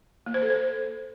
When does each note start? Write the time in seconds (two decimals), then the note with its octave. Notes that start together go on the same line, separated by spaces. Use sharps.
0.26 A#3
0.34 C5
0.42 A4
0.50 C5